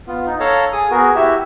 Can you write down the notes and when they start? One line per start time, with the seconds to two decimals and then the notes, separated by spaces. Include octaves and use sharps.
0.07 B3 F4
0.27 D#4
0.40 A4 C#5 F5 A5 A#5
0.72 G#4 D#6
0.91 B3 F#4 G#4 A#4
1.15 E4 F#4 G4 E5